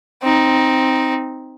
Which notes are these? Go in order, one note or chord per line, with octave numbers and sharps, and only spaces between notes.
C4 D#4